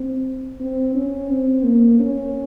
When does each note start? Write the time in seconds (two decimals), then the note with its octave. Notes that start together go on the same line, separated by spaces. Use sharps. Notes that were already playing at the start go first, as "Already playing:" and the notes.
Already playing: C4
0.60 C4
0.95 C#4
1.29 C4
1.64 A#3
1.99 C#4